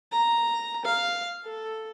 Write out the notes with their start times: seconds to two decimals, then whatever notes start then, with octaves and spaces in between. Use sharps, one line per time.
0.12 A#5
0.85 F5
1.45 A4